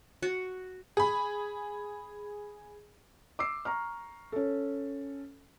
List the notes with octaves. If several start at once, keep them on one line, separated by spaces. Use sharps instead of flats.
F#4
G#4 B5
D6 E6 C7
A#5 C#6 F6
C#4 A4